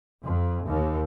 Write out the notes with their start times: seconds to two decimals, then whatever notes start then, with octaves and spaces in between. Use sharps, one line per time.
0.25 F2
0.67 D#2